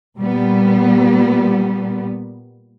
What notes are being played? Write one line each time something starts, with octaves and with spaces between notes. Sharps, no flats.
A#2 G3 B3